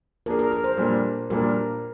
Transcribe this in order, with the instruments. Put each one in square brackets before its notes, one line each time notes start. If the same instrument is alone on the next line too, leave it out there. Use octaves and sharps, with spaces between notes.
[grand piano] F3 A#3 D4 G#4 [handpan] A#4
[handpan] A#4
A#4
C5
[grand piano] A#2 G3 A#3 D4
[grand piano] A#2 G3 A#3 D4 [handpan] A#4